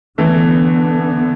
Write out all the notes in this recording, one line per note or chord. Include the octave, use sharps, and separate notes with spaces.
D3 E3 A3 B3